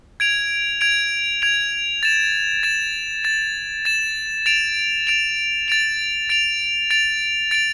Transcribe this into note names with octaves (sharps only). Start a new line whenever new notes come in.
G#6 D7 F7
G#6 D7 F7
G#6 D7 F7
A6 E7
A6 E7
A6 E7
A6 E7
A6 D7 F7
A6 D7 F7
A6 D7 F7
A6 D7 F7
A6 D7 F7
A6 D7 F7